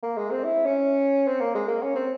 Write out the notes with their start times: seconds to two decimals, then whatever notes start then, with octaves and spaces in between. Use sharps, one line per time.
0.03 A#3
0.17 G#3
0.31 C4
0.44 E4
0.65 C#4
1.28 C4
1.40 A#3
1.55 G#3
1.68 A#3
1.82 C#4
1.96 C4